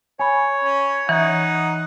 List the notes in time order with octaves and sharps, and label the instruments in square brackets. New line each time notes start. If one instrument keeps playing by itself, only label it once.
[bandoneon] C#5 [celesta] G#5 B5
[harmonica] C#4
[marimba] E3 [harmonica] D#4 F#5